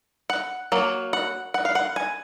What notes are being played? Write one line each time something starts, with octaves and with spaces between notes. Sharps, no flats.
F#5
F#3 A#3
F#5
F#5
F5
F#5
G#5